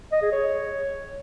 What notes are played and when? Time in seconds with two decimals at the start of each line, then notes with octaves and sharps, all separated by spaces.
0.12 D#5
0.22 G#4
0.32 C#5